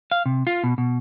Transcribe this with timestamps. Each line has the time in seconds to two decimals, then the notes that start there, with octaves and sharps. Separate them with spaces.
0.11 F5
0.26 C3
0.47 F4
0.64 B2
0.78 B2